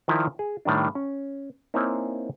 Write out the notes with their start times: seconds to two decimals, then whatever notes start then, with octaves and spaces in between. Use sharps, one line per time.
0.08 D#3 F3 E4 A#4 D5
0.39 G#4
0.65 A2 D#3 G3 D4
0.95 C#4
1.74 A#3 C4 D#4 E4 C#5 G#5